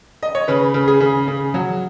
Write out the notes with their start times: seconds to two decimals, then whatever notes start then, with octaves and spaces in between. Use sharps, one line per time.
0.23 D#5
0.35 C#5
0.48 C#3 B4
0.74 C#3
0.88 G#4
1.00 C#3
1.28 C#3
1.54 F#3